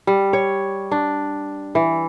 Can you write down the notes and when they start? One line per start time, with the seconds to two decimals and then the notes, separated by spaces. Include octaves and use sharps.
0.07 G3
0.33 C#5
0.92 D4
1.75 E3